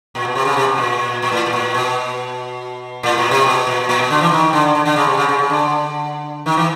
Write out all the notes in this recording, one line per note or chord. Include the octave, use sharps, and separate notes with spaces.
A#2
B2
C3
C#3
C3
B2
A#2
A#2
A2
A2
A#2
B2
A2
A#2
C3
B2
A#2
A#2
B2
D3
E3
D#3
D3
D3
D3
C#3
C3
C#3
C#3
C#3
D3
D#3
E3